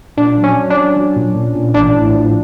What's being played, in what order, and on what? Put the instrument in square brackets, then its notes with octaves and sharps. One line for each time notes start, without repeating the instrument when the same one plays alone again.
[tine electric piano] A#2 [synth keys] D4
[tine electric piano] F#3
[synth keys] C#4
[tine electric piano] F#3
[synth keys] D4
[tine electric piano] F#3
F#3
A#2
A#2
A#2
[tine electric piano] A1 [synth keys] D4
[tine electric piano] A2
F3